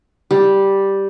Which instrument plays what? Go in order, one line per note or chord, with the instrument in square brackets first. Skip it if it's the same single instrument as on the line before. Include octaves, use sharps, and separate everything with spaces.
[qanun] G3